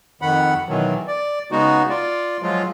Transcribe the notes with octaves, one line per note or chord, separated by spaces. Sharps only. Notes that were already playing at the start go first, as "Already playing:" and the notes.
F2 D#3 F#5 B5
B2 D#3 E3 F#3
D5
C#3 G#3 B3 D#4 F#4
F4 D5
F3 F#3 G#3 F4